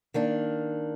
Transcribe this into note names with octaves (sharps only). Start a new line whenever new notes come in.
D#3 A#3 D4